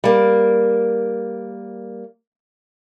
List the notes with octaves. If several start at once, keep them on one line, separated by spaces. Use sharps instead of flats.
G3 A#3